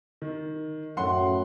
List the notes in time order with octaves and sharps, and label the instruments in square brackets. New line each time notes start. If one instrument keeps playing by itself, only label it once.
[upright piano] D#3
[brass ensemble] F#2 A2 [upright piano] F#5 C6